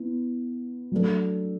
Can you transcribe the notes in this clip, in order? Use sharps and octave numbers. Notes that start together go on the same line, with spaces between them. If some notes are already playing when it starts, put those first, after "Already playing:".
Already playing: B3 E4
F#3 A3 D4 A4